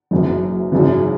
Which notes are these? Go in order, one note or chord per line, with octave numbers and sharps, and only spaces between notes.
F#1 F#2 E3
G#1 F#2 C#3 E3